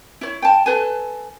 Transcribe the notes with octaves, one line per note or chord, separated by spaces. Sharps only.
E4 C#5
G5 A5
A4 B4 G#5